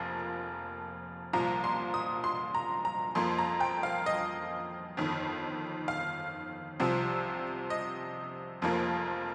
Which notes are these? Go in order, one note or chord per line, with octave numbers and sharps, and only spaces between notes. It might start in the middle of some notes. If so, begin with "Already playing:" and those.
Already playing: F1 F2 F3 A#3
C2 A#2 F3 A#5
C6
D#6
C6
A#5
A#5
F2 F3 A#3 C6
A#5
G5
F5
D#5
G1 F2 D#3
F5
C2 C3 F3 C4
D#5
F1 F2 F3 A#3